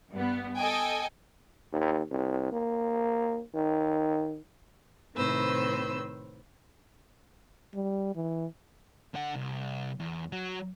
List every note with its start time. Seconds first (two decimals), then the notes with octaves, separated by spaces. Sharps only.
0.11 G2 B3
0.56 A4 D#5 G5 G#5
1.73 D#2
2.11 C2
2.52 A#3
3.55 D#3
5.15 A2 C3 D#3 B4 C5 E6
7.74 G3
8.15 E3
9.14 D3 F#5
9.35 C2
10.00 E2
10.32 F#3